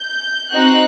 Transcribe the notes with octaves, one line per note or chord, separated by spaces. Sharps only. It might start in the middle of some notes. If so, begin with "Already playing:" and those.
Already playing: G6
C4 D#4 F#4 F#6